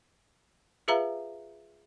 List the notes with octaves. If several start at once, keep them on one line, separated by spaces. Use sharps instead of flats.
F4 G#4 B4 E5 F5 A#5